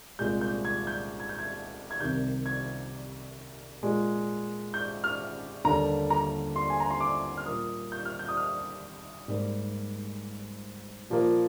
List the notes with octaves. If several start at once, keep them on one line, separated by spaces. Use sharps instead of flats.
C2 A#2 G#3 G6
G6
G#6
G6
G#6
G6
G#6
G#6
C2 C3 D#3 G6
G#6
A#2 G#3
G6
F6
D#2 D3 G3 A#3 A#5
A#5
C6
G#5
A#5
C6
D6
F6
A#2 G3 A#3 D#6
G6
F6
G6
D#6
F6
G#2 G3 A#3
A#2 F3 A#3